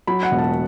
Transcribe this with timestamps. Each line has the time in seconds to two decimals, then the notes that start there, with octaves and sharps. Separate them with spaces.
0.07 F#3 B5
0.23 F#5
0.31 E1
0.38 A5